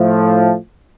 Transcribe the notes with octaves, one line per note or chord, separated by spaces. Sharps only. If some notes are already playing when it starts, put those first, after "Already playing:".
Already playing: A2 F3 A3